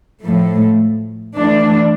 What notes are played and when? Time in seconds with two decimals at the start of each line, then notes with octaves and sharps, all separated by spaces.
0.23 A2 F3 A3
1.34 E3 A3 D4